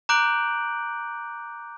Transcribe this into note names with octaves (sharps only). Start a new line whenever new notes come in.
A#5 D6 F#6 G6 D7 F#7